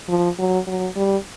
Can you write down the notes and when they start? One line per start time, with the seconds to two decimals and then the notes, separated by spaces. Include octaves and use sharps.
0.09 F3
0.38 F#3
0.67 F#3
0.96 G3